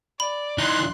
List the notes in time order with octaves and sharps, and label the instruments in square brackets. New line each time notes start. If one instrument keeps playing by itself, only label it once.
[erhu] D5 [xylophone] B5
[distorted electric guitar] E3 D#4 [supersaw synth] C6 F#6